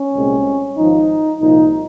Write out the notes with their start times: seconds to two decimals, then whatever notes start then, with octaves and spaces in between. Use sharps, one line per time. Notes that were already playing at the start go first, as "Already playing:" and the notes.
Already playing: C#4
0.13 C2 A#2 G#3 C4
0.77 G#1 G#2 F3 D#4
1.40 C2 A#2 F3 D#4